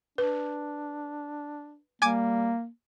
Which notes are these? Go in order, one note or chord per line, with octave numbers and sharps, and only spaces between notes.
D4 B4
G3 A#3 G#5 D6 G#6